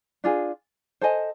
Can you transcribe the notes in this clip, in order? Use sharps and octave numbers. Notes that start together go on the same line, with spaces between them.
D4 F4 G#4
A4 C5 D#5 G#5